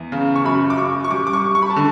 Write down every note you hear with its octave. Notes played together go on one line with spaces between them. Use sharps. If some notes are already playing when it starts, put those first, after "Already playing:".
Already playing: E2
C#3
C#6
F#2 B5
D6
F#2 C#6
C#6
G3 D6
D6
C#6
G3
C#6
B5
A5
D3